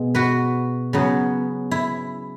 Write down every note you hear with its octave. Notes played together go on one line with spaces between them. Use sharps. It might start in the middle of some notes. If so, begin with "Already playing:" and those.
Already playing: B2 G#3
F#4 B4
C#3 F#3 B3
E4